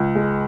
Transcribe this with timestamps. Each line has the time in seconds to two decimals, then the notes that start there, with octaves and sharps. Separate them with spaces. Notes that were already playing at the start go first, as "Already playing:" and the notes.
Already playing: C#2
0.15 G#3